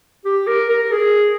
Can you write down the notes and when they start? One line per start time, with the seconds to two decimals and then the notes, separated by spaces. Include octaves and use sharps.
0.25 G4
0.47 A#4
0.69 A#4
0.91 G#4